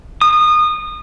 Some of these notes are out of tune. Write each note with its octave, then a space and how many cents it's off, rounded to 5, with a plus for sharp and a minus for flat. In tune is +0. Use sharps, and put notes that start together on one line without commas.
D#6 -25